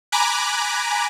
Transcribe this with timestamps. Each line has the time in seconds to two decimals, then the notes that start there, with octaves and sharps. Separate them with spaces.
0.12 G#5 A#5 B5 D6 F#6